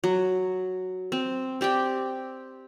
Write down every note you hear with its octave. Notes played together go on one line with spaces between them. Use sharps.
F#3
C4
C4 G4 D5 G5